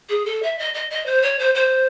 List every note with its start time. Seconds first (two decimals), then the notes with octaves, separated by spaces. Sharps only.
0.09 G#4
0.25 A4
0.42 E5
0.58 D#5
0.74 D#5
0.90 D#5
1.06 C5
1.22 C#5
1.39 C5
1.54 C5